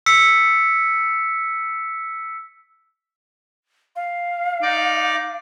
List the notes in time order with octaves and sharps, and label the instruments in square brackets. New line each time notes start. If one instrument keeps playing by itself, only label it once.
[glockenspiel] E6 B6 C#7
[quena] F5
[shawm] D#4 [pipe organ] D5 D6